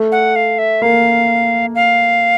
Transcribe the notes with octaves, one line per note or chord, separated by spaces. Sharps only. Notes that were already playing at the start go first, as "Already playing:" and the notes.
Already playing: A3
F#5
F5
E5
A#3 F5
F5